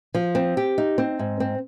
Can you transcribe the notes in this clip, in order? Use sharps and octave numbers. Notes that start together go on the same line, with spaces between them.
F3
C4
G4
D#4
C4
G#2
C4